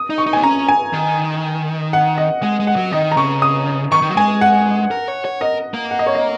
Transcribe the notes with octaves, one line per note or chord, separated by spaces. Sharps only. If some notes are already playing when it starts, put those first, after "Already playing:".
Already playing: D#6
D#4
C#6
D#4
A#3 G#5
C#4 A#5
G#5
D#3
F#5
D#5
G#3 F#5
G#3
F#5
F#3
D#3 D#5
A#5
C#3 C#6
D#6
D#3 C#6
D#3
F#3
G#3 G#5
F#5
A#4
C#5
C#5
A#4 D#5
A#3
F#5
D#5
C#5
D#5